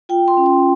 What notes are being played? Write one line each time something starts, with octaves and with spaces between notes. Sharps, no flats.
F4 G5
C6
C#4
C6